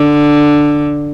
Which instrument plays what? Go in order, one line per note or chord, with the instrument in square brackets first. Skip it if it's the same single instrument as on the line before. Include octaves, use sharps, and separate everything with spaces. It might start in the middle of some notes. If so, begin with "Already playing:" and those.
Already playing: [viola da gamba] D3